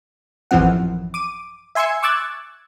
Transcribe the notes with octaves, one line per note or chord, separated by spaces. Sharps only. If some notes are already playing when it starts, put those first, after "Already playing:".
A1 F#2 E3 F3 C4 F#5
D6 D#7
E5 G#5 C6 E6 G#6 C#7
C#6 D6 E6 F#6 G#6 A6